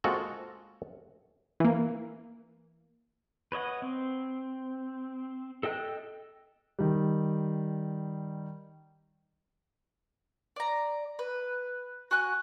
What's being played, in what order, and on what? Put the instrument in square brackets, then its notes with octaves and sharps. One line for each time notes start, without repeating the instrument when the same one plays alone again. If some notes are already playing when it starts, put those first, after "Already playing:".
[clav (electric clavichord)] G#3 A#3 C4 F4 F#4 A4
[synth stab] E3 A#3
[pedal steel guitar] B4 C#5 D#5 F#5
C4
A4 D#5 G5 F#6
[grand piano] D#3 G3
[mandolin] D5 A#5
B4
F#4 G#5 F#6